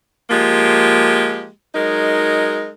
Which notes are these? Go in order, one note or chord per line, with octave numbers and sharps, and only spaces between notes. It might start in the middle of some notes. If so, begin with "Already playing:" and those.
F3 G#3 A#3 G4
F#3 G#3 D#4 A#4